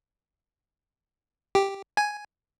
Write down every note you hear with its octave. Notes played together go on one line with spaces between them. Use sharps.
G4
G#5